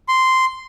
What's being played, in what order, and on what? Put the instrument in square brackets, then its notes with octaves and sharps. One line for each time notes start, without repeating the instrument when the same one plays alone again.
[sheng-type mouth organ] C6